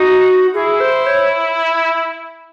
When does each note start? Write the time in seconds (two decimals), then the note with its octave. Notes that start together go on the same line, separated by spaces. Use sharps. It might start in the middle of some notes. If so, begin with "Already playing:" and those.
Already playing: D#4 F#4
0.54 E4 G#4
0.80 C5
1.06 C#5